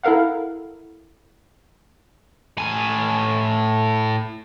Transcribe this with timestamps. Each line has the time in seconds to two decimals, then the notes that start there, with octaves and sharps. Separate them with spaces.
0.04 E4 A4 A#4 F5 F#5
2.57 A2 G#5